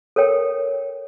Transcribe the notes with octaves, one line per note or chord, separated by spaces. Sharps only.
A4 A#4 C#5 G5